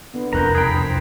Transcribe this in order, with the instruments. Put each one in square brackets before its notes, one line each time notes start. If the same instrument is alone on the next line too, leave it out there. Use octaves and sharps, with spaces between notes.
[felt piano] D3 [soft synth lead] B3
[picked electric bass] E1 C2 F2 [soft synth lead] A#4 [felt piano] B4 F#6 G6 [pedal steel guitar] A#5
[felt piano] G2 A#5 B5 [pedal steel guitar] G#4 G5 [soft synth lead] B6
[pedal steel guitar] C5